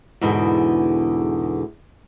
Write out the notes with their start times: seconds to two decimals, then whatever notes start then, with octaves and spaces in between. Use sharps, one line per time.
0.21 E2 G#2 B2 D3